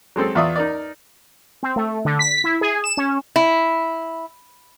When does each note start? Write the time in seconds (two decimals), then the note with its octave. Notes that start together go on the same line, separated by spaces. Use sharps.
0.16 F#3 G#3 C4 A4
0.35 E2 F4 D5 E5 C#6 D#6
0.56 D#4 A#4 D5
1.63 C4
1.76 A3
2.05 D3
2.19 B6
2.44 E4
2.61 G#4
2.84 E7
2.97 C#4
3.36 E4